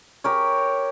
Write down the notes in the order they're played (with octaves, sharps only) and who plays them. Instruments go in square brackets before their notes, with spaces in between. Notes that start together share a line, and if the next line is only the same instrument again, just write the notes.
[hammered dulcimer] G4 A#4 C#5